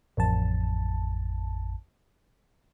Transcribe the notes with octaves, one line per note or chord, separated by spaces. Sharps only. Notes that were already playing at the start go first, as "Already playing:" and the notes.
A1 F2 A5